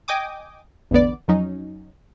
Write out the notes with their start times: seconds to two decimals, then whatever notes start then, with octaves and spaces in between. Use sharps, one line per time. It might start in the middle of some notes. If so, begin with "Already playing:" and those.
0.08 D#5 G5 G#5 D6 D#6
0.91 A1 E2 D3 B3 D5
1.28 F2 F#3 C#4 D#4